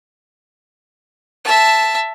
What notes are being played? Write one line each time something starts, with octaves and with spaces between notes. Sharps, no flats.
E5 A5